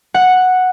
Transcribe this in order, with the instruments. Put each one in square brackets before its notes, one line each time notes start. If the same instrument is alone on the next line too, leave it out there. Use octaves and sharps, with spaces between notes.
[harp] F#5